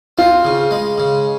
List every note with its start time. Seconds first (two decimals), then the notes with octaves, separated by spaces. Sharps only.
0.18 C4 F4
0.45 C#3
0.71 G#3
0.98 C#3